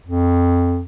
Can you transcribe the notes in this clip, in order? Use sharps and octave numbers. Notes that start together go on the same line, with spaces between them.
F2